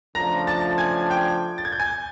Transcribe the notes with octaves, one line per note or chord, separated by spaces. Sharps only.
C#3 F3 A3 D4 A#5 A#6
A5 A6
G#5 G#6
G5 G6
A6
G#6
G6
G#5 G#6